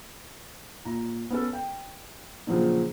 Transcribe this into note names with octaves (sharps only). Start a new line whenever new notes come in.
A#2 A#5
B3 C#4 A4
G5
A#2 C#3 F3 F#3 C4 D4